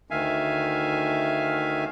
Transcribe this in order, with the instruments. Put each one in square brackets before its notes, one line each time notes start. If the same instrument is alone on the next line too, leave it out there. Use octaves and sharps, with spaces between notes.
[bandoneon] D2 D#3 E5 F5 G#5